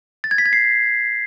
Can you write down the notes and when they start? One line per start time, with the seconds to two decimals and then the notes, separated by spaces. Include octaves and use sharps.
0.24 A6
0.31 G#6
0.38 B6
0.46 G#6
0.53 C7